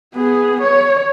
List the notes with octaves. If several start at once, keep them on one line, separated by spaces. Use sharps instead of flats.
B3 G#4
C#5